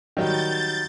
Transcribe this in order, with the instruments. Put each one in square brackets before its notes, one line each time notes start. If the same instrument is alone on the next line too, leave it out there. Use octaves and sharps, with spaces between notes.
[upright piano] D#3 F#3 G3 [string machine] G6 A6